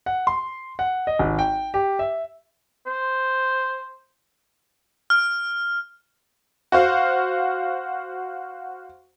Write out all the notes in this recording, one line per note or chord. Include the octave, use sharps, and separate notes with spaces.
F#5
C6
F#5
D#5
G#1
G5
G4
E5
C5
F6
F#4 C5 F5